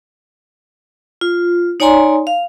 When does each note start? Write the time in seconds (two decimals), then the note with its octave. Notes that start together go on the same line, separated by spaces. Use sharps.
1.21 F4
1.80 D#4 C#5 D5 G#5 A#5 C6
2.27 F5